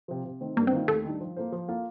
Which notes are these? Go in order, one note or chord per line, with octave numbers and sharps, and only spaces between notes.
C3 F3
C3
D#3 A3 C4
G2 A#3
C4
D#3 A#3 F4
D#2 A3
D#3 G3 D4
F3
A#3 F4 A4 C5
F3
A#3 F4 A4